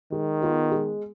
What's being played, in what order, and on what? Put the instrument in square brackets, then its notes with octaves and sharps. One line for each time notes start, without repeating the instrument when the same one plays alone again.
[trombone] D#3 [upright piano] G#3
[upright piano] B3 F4 G#4
G#3